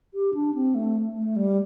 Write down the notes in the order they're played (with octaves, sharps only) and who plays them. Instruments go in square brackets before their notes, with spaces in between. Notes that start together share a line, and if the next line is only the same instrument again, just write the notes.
[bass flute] G4
D4
C4
A3
A3
G3